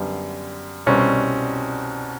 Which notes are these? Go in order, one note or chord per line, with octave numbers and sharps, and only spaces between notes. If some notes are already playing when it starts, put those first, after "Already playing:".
Already playing: F#2 D3 G3 B3
C2 B2 G3 C4 C#4